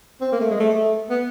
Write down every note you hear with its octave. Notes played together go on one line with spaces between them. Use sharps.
C4
A#3
A3
G#3
A3
A3
B3